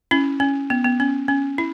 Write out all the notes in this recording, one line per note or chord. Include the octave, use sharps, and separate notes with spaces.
C#4 E4
C#4
B3
B3
C#4
C#4
E4